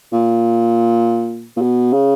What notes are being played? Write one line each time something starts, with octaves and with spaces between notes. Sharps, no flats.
A#2
A#2
B2
C#3